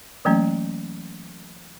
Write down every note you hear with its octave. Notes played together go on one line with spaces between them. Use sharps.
E3 F#3 A3 A#3 C#4